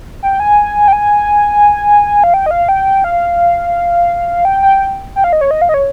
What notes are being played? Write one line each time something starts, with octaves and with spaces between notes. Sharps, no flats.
G5
G#5
G5
G#5
F5
G5
D#5
F5
G5
F5
G5
G5
G5
F5
D#5
C#5
D#5
F5
D#5
C#5